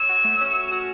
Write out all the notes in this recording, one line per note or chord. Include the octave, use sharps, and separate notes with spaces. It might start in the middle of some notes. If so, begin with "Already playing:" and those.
Already playing: C#5 E6
F#4
A3
C#4
C#5
F#4